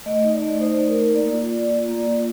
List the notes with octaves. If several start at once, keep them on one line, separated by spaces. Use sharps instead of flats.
A3 D#5
D#4
D5
A3
D#4 C5
A3
A#4
D#4
A#3 D5
F4
A#3
F4
A#3
F4